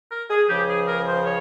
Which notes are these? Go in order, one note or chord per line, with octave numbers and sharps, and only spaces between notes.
A#4
G#4
C#2 C#3 F3 G4
G#4
A#4
C5
C#5